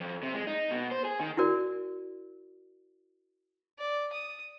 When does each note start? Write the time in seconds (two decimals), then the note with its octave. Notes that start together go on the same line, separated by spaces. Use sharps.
0.01 F2
0.23 C3
0.34 G#3
0.47 D#4
0.71 B2
0.91 C5
1.05 G#4
1.21 D#3
1.37 E4 F#4 A#4 D5
3.79 D5
4.13 D#6